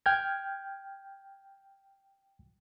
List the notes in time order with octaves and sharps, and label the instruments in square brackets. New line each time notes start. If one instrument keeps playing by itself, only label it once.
[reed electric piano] G5 F6 G6 G#6